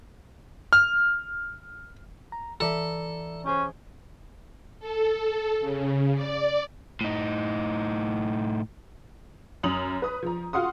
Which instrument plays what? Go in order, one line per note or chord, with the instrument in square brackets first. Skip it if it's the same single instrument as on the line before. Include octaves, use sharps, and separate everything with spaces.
[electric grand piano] F6
[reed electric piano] A#5
[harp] E3 E5 [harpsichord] A4 [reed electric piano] D5 A#5
[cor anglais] C#4 [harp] G4 G#4 C5
[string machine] A4
C#3
D5
[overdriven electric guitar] A2 D#4
[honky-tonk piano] F#2 D#6 F7 F#7
B4 D#6
F3 A#5
F4 F#4 F5 F#5 C6 D#6